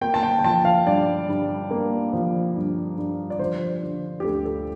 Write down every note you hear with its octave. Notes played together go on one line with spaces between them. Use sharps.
A#3 G5
A5
G5
G5
F3 A5
F5
G2 D5
G2
A#3
F3
G2
G2
D5
F3 C5
D3
G4
D2 A4
A4